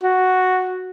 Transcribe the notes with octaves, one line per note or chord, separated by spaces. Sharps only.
F#4